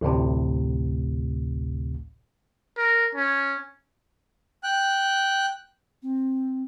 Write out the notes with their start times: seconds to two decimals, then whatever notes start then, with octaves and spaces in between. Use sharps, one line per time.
0.01 A1 D2 A2 C3
2.78 A#4
3.15 C#4
4.64 G5 F#6
6.03 C4